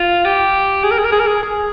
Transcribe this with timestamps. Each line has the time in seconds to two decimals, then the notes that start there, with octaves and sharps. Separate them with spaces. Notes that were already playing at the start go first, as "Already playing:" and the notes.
Already playing: F4
0.25 G4
0.84 G#4
0.91 A#4
0.98 G#4
1.05 A#4
1.12 G#4
1.20 A#4
1.27 G#4
1.43 G#4